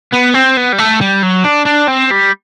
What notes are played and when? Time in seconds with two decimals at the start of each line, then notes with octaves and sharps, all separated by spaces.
0.12 B3
0.34 C4
0.57 B3
0.73 G3
0.79 A3
1.01 G3
1.23 F#3
1.45 D4
1.66 D4
1.88 C4
2.11 G3